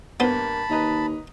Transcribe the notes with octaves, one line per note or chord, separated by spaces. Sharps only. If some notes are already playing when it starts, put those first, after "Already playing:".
G2 A#3 B3 C5 A5 B5
D#2 B4 D#5 A#5